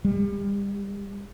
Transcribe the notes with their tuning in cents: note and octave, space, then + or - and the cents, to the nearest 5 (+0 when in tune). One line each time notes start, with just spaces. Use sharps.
G3 +35